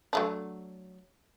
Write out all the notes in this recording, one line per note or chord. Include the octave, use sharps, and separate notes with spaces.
F#3 A3 D4